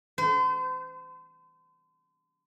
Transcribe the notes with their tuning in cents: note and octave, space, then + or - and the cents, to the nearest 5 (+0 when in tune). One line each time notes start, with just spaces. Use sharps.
C5 -40